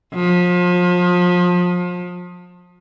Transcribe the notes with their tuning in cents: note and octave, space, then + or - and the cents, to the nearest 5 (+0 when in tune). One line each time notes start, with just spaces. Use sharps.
F3 +30